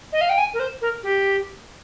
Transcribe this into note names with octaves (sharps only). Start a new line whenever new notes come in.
D#5
F5
G5
G#5
A#4
C5
A#4
G4